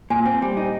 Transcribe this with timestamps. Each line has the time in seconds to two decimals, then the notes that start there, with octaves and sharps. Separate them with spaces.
0.10 A#2 G#5
0.26 C4
0.42 G3
0.57 D#4